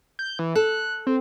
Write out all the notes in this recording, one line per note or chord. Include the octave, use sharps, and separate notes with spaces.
G6
E3
A4 F#6
C4